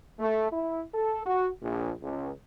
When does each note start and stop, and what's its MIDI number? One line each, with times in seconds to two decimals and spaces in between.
0.19 0.49 57
0.52 0.81 64
0.93 1.21 69
1.25 1.48 66
1.62 1.91 34
2.01 2.31 37